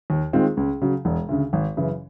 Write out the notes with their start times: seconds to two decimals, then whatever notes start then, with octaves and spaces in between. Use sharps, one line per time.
0.10 D#2
0.33 D#3 G#3 C4 F4
0.57 C#2
0.81 C#3 F#3
1.05 E1
1.29 D2 C#3
1.53 G#1
1.77 F#2 C#3 E3